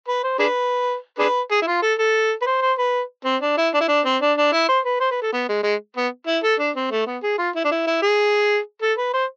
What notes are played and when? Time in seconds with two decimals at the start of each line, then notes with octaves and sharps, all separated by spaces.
0.08 B4
0.24 C5
0.39 D4 G#4 B4
1.19 D4 G#4 B4
1.51 G#4
1.62 E4
1.67 F4
1.82 A4
1.99 A4
2.42 B4
2.46 C5
2.62 C5
2.79 B4
3.25 C4
3.42 D4
3.58 E4
3.74 D4
3.81 E4
3.88 D4
4.05 C4
4.22 D4
4.38 D4
4.53 E4
4.68 C5
4.85 B4
5.01 C5
5.11 B4
5.22 A4
5.33 B3
5.49 G#3
5.63 G#3
5.96 B3
6.27 E4
6.44 A4
6.59 D4
6.76 C4
6.91 A3
7.07 B3
7.23 G#4
7.39 F4
7.55 E4
7.65 D4
7.71 E4
7.87 E4
8.02 G#4
8.82 A4
8.98 B4
9.14 C5